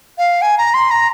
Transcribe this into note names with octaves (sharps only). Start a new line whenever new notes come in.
F5
G#5
A#5
C6
A#5